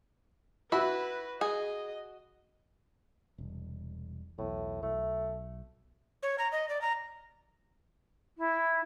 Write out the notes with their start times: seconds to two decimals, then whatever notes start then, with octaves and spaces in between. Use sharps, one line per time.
0.72 E4 F#4 B4 B5
1.41 G#4 D#5
3.38 E1 C2
4.38 B1 E2 A2
4.83 B1 A3
6.23 C#5
6.39 A#5
6.52 D#5
6.69 D5
6.82 A#5
8.38 E4